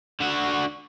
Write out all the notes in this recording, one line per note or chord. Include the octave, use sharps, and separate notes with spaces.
D3 F#4